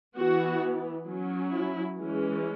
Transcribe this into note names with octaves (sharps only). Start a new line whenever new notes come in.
E3 B3 F#4
F#3 C#4
E4
E3 G#3 C#4